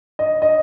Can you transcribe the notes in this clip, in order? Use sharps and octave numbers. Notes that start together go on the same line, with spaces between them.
D#5
D#5